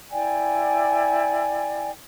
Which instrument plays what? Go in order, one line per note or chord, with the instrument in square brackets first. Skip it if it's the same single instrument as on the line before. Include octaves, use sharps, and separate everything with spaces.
[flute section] E4 D5 G5 G#5